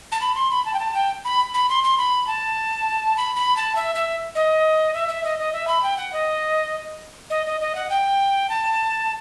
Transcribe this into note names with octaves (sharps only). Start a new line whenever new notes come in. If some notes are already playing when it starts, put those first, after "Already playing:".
A5
B5
C6
B5
A5
G5
A5
G5
B5
B5
C6
C6
B5
A5
B5
B5
A5
E5
E5
D#5
E5
E5
D#5
D#5
E5
B5
G5
F#5
D#5
D#5
D#5
D#5
F#5
G5
A5